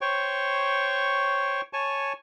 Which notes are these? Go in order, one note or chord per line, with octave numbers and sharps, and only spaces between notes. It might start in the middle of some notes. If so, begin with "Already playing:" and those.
C5 C#5 G5 C#6
C#5 G#5 A5 C#6